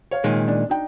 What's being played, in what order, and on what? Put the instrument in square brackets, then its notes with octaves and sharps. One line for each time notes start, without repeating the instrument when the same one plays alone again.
[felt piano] C#5 F5
[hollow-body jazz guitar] A#2 D#3 G#3
[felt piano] D4
D4 D#4 G5